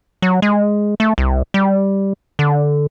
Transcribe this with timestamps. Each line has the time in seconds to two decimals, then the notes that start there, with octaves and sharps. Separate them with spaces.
0.22 F#3
0.42 G#3
1.00 A3
1.18 C2
1.54 G3
2.39 D3